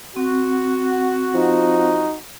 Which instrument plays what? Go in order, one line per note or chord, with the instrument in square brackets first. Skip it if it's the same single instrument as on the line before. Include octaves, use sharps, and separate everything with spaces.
[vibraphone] C4 [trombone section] F#4
[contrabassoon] F3 [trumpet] D#4